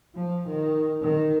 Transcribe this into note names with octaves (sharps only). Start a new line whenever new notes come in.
F3
D#3
D#3